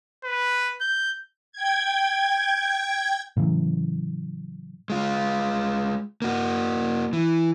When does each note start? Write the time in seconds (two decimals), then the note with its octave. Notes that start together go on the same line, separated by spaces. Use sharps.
0.24 B4
0.81 G6
1.52 G5 G#6
3.36 A2 C#3 E3 F#3
4.90 G#3 F4
6.22 A#3 F#4
7.13 E3